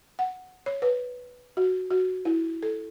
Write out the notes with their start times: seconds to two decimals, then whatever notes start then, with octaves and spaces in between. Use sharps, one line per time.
0.19 F#5
0.66 C#5
0.82 B4
1.57 F#4
1.90 F#4
2.25 E4
2.63 A4